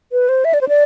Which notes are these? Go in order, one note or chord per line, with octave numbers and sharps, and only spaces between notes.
B4
C5
E5
D5
C5
D5